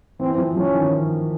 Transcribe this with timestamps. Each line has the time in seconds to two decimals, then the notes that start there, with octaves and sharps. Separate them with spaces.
0.19 E3 C4
0.38 F3
0.56 F3 C#4
0.75 D#3